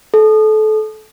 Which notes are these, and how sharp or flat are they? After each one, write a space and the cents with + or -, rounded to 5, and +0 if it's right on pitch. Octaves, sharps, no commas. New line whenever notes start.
A4 -25